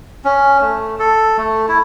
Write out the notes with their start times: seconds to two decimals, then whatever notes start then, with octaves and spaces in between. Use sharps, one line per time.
0.24 C#4
0.61 A3
0.99 A4
1.38 A3
1.69 E4